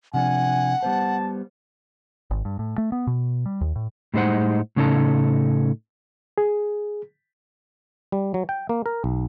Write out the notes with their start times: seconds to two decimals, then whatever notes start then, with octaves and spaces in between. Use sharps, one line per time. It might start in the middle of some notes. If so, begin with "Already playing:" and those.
0.14 C3 F3 D4 F#5 G#5
0.83 G3 B3 C5 A5
2.31 G#1
2.45 G2
2.59 A2
2.78 A3
2.92 B3
3.07 B2
3.46 G3
3.61 D#2
3.76 A2
4.14 A2 G3 G#3 D#4 C5 F#5
4.76 A2 C#3 C#4 D#4 A4 A5
6.38 G#4
8.12 G3
8.34 F#3
8.49 G5
8.69 A#3
8.86 A#4
9.04 B1